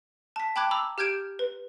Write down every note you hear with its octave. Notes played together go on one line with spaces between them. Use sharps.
A5 B6
G5 A5 B5 D6 F#6 G#6
A#5 B5 D6 E6
G4 F6 G6 G#6 D7 E7
B4